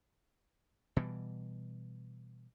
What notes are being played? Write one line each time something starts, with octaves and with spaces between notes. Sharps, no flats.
B2 E3 G3